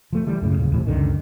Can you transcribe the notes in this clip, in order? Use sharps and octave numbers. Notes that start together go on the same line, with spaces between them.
F3 A3
E3 G3 A3
F#2 A2 C#3
D#1 C#3
E2 A2 C3
C#2 F#2 D3 D#3